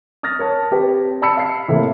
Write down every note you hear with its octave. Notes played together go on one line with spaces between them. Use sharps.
D#6 F6 A6 A#6
A#4 C#5 A5
C4 G4 B4
D5 A5 B5 E6 B6 C#7
F5 C7
A2 C3 A3 A#3 E4